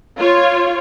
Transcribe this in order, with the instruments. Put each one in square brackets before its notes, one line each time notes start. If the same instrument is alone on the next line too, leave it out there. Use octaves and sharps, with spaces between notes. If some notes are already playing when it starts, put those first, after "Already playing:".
[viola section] F4 C#5